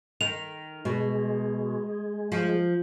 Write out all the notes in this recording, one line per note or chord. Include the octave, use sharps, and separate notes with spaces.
D#3 F7
B2 G#3
F3